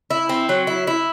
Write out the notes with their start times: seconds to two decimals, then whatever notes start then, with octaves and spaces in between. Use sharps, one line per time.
0.10 E4
0.29 C4
0.49 F#3
0.67 E4
0.87 E4